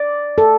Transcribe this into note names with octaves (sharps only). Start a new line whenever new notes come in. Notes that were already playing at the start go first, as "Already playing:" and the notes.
Already playing: D5
A4